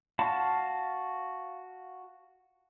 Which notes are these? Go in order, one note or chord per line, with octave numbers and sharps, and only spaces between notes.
F#4 F5 A5 B5